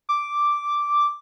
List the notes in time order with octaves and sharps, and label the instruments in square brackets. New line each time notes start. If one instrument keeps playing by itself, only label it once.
[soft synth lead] D6